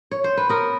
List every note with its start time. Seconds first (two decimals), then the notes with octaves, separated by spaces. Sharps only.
0.11 C#5
0.24 C5
0.37 B4
0.49 B3 A#4